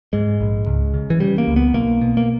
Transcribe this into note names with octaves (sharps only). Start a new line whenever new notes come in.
G#2 G#3
A#1
C#2
C#3
E3
C#3 G3
A#3
C#2
B3
B1 A#3
B2
A#3